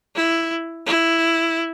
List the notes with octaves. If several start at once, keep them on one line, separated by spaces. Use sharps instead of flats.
E4
E4